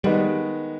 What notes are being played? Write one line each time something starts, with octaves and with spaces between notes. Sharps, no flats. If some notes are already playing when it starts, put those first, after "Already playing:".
D#3 G3 G#3 B3 D#4